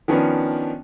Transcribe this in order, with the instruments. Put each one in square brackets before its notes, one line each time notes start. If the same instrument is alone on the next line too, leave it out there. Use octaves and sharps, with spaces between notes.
[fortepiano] D#3 F3 B3 C#4 D4